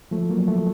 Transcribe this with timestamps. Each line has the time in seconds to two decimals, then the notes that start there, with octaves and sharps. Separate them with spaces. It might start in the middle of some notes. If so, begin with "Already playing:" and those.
0.11 F3 A3
0.30 F#3 A#3
0.48 F3 A3